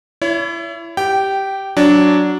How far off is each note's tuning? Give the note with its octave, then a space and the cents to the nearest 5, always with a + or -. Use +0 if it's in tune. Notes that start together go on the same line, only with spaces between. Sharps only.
E4 +25 C#5 +40
G4 +0 G5 -15
F#3 +0 D4 -10